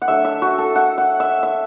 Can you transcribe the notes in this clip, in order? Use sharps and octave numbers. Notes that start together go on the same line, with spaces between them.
F#5
F#3 A3 D4 E5
E5
F#4
A4
F#5
F#5
E5
E5